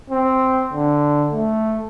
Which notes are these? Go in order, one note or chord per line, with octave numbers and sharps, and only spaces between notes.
C4
D3
A3